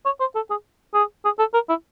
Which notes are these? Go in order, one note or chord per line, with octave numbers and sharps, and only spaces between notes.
C#5
C5
A4
G#4
G#4
G#4
A4
A#4
E4